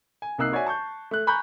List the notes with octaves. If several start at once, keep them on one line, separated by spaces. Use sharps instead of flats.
G#5
C2 A#3 D#4 E6 F#6 C7
F#4 C#5 D5 E5 G#5
A5 C#6 G6
A3 F#6
G#5 A#5 B5 C#6 F#6 G6